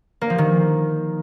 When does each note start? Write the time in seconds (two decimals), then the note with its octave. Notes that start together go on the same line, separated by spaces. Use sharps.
0.21 A#3
0.30 F3
0.38 D#3